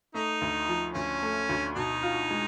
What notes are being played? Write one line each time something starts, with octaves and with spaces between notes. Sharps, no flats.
A3 D#4
D2
F3
D2 C#4
A3
D2
B2 D#4
F4
G#3